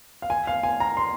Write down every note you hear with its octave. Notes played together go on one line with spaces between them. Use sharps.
F5
G#5
F5
G#5
A#5
C6